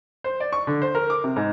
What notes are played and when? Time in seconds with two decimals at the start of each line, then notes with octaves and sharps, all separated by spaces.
0.24 C5
0.40 D5
0.53 C#6
0.67 D3
0.82 C5
0.95 A#4
1.10 D6
1.24 C3
1.36 G#2